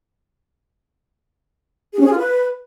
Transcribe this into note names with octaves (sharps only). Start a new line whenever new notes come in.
G#4
C#4
G#4
F4
B4